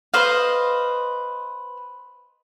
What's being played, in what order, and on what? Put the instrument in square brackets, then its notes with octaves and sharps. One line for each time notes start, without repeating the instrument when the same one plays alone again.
[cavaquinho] B4 C5 D#5 F5